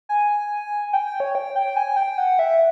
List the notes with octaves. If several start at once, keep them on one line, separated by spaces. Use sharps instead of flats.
G#5
G5
G5
C#5
G5
G5
G#5
G5
F#5
E5